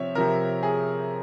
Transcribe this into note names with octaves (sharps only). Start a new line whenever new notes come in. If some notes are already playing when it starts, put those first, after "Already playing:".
Already playing: C3 F3 C4 C#5 E5
C3 F3 C4 A#4
G#4